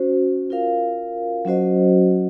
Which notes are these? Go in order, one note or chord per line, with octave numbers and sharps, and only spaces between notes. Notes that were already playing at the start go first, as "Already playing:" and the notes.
Already playing: C#4 F#4 C5
F4 A#4 F5
F#3 C#4 F#4 C5 D#5